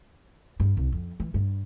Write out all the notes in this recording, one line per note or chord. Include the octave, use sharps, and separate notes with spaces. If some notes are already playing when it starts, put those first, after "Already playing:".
G2
C2
F2
E3
G2